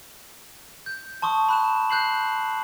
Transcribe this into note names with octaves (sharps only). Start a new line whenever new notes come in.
G6
A5 C6 C#6 D#6
B5 F#6 E7
F#6 G6 C7 F#7